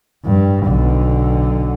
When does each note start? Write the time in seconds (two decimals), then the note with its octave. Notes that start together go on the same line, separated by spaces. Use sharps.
0.25 G2
0.66 B1 D3